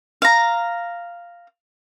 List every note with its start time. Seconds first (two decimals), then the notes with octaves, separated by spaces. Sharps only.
0.22 F5 A#5